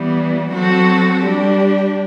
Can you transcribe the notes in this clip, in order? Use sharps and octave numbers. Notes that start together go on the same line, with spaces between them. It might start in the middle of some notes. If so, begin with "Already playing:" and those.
Already playing: E3 G3 B3
F#3 C4 F#4 A4
G3 D4 G4